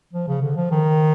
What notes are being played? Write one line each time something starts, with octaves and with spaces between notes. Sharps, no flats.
F3
C#3
D3
F3
D#3